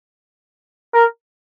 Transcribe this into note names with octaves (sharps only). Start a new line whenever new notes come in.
A#4